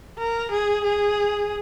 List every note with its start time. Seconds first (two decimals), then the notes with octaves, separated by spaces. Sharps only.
0.19 A#4
0.51 G#4
0.84 G#4